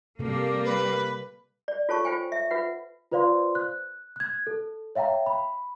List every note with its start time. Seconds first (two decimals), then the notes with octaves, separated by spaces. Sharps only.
0.19 C3 G3 A#3 A4
0.65 B4
1.68 D5
1.89 F4 A4 C#5 A5 C#6
2.05 F4 C5 G5 G#5
2.32 E5
2.51 F4 B4 E5 F#5
3.11 F4 B4 C5 D5 F5 C6
3.55 F#6
4.16 F#6 G#6
4.47 A4
4.95 C#5 E5 F5 G5 A#5
5.26 B5